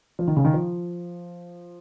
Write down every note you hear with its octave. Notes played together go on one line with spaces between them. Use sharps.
F3
D#3
C#3
D#3
F3